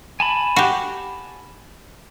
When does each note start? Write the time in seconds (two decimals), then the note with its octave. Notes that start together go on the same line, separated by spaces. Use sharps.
0.20 G#5 A5 B5
0.56 F#4 G4